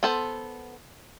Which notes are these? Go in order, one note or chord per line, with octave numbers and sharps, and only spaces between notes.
B3 A4 C5